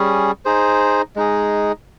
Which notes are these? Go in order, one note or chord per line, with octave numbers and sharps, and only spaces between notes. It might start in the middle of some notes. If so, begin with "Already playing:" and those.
Already playing: G3 C#4 G#4
D#4 G#4 C5
G#3 D#4 G#4